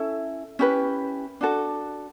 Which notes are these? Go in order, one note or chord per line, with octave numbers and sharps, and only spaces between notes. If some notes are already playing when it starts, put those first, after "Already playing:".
Already playing: C#4 E4 A4 E5
C#4 E4 G4 B4
D4 F#4 A4